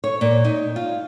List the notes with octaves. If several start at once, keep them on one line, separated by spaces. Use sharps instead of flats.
C#5
A#2
D#4
F4